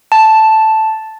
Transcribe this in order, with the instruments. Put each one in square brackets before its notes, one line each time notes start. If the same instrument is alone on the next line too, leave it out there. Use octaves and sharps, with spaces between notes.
[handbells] A5